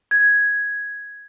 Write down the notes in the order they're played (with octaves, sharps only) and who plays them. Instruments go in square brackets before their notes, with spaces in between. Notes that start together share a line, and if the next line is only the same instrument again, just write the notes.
[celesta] G#6